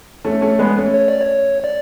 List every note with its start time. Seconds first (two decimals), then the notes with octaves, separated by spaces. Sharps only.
0.25 A3 C#4
0.41 A3 C#4
0.59 G#3 B3
0.77 A3 C#4
0.94 C#5
1.08 D5
1.21 C#5
1.64 D5